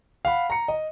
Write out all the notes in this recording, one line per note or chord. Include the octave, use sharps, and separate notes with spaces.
F5 F#5 B5
A#5 C#7
D#5